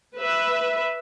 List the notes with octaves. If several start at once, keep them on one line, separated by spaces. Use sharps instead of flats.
B4 E5